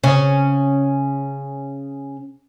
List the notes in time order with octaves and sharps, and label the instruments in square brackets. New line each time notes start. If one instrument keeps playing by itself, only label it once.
[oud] C#3 C#4